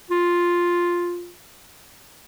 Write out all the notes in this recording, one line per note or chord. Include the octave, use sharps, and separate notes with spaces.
F4